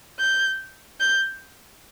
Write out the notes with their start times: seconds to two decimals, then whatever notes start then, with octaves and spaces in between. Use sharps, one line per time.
0.19 G6
1.00 G6